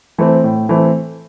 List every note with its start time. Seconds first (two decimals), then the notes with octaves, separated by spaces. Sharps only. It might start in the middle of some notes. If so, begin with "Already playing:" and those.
0.18 E3 A3 C4
0.44 A2
0.69 E3 A3 C4